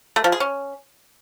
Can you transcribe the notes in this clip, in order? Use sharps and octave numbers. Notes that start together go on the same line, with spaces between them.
A3
F3
G#4
C#4